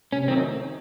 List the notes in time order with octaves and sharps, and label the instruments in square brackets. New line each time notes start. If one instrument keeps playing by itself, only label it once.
[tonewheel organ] C3 [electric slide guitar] C#4
[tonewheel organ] D#3 F#3 A3 D#4 [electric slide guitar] C4